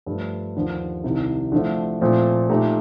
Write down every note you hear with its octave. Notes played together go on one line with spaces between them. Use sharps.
G2 F3 A3
D#2 D3 F3
C2 C3 D#3
D3 F3 A3
A#2 F3 A3 C4
A#2 A3 D#4 G4